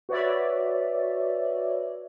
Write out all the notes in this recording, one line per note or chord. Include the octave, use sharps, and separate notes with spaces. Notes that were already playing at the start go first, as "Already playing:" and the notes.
F#4 B4 C#5 D5 E5